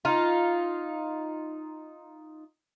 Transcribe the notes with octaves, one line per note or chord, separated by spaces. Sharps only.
D#4 F4